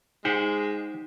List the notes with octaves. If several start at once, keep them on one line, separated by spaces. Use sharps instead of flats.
G#3 D#4 G4 C5 F#5